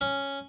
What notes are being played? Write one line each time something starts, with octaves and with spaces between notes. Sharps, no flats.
C#4